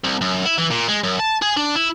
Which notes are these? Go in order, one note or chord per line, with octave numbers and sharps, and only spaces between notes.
C2
F#2
E4
E3
A#2
G#3
F#2
A5
G#4
D4
E4